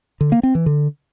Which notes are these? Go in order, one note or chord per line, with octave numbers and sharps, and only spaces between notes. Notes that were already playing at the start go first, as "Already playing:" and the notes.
D3
A#3
C4
E3
D3